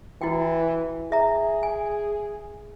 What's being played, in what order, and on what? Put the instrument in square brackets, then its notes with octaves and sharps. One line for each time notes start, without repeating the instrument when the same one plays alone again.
[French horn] E3 [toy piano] E4 F#4 G5
[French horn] G#4 [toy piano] E5 A#5
[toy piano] G#5